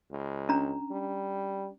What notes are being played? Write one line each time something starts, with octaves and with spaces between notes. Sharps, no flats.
C#2
C#4 D4 A#5
G3